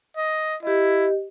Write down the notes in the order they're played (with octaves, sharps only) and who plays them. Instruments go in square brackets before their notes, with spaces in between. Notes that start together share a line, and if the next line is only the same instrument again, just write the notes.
[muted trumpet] D#5
[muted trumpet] E4 [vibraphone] G4 D#5